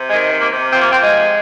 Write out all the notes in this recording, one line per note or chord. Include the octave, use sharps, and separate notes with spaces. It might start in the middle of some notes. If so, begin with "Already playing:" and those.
Already playing: C3
D#3 G#3
C3
A#3
C3
F3 C4
A#3
F3 C4
G#3
C3